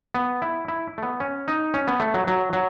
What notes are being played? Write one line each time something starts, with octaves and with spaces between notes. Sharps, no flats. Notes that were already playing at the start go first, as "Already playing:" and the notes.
B3
E4
E4
A3
B3
C#4
D#4
C#4
B3
A3
F#3
F#3
F#3